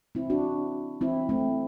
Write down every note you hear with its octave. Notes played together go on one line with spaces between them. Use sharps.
C4 E4
D4 F#4
C4 E4
A3 C4